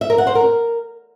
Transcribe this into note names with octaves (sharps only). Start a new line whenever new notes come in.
E5
A#4
F#5
C5
A#4